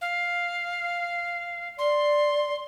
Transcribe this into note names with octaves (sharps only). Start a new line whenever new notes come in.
F5
D5 C6